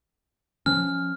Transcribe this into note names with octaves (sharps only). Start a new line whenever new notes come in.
F3 C#4 F6